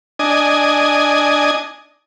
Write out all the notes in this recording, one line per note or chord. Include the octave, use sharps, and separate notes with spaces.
D4 D#5 G#5